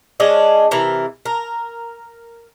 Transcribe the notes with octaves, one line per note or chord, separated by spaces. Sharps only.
G#3 C#4 D4 D#5
C3 E3 A#4
A#4